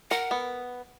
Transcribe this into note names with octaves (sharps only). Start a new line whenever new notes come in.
A#4 F#5
B3